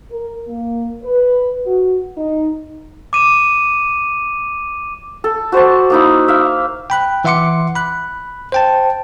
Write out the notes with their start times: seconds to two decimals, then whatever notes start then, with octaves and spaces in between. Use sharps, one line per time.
0.11 A#4
0.48 A#3
1.03 B4
1.66 F#4
2.18 D#4
3.13 D6 D#7 E7
5.24 A4
5.52 F#4 C5 D5 A5
5.90 A#3 D#4 E4
6.28 E5 F5
6.90 G5 B5 F#6
7.24 E3 E5 F#5 C6 D6 C#7
7.75 B5 F#6
8.52 C5 G5 A5